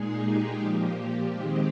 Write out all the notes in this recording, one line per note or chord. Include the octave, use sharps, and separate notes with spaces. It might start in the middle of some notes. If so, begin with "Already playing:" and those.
Already playing: A#2 G#3 D#4 G#4
G4
A#2 F3 A#3
D#3 G#3 C4 G4